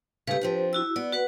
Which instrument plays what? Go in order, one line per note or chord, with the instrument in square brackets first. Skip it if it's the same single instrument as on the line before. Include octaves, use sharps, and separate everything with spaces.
[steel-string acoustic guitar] C#3 A3 [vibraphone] G4 B4
[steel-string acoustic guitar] F3 C4 D4
[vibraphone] E4 F#4 E6
[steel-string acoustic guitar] B3 [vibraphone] D5
[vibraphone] F#4 B4 F#5